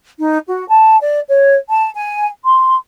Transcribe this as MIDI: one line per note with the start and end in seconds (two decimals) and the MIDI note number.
0.18 0.39 63
0.48 0.64 66
0.69 0.97 81
1.01 1.20 74
1.28 1.56 73
1.69 1.90 81
1.95 2.27 80
2.45 2.75 84